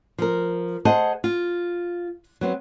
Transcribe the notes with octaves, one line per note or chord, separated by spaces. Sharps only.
F3 A#4
G#4 C5 D#5 F#5 A5
F4
F#3 B3 C4